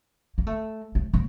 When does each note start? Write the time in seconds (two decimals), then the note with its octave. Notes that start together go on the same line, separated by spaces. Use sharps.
0.38 A#3
0.47 A3
0.95 A3
1.14 A#3